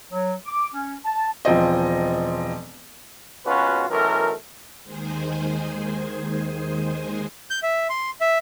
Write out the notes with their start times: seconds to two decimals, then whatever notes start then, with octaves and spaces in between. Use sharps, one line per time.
0.12 F#3
0.46 D6
0.73 C#4
1.05 A5
1.45 E1 F3 C4 D#5
3.45 G#1 B2 C#4 F4 F#4 B4
3.89 B1 F#2 E3 A3 A#4
4.84 D#2 D#3 G#3 G#4 C5 G#5
7.50 G6
7.63 E5
7.90 C6
8.21 E5